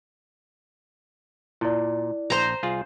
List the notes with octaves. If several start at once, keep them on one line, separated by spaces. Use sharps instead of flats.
A#2 E4 D5
A#1 C5 A#5
C2 F4 G#4